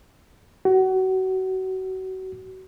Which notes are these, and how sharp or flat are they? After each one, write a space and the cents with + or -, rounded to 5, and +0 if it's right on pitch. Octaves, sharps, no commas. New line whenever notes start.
F#4 +30